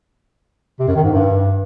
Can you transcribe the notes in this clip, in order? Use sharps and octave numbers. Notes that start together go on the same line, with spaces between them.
C3
F#2
D#3
G#2
G2